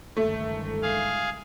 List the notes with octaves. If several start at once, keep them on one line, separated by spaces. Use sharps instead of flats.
G1 C#2 D#3 A3
G#4 F5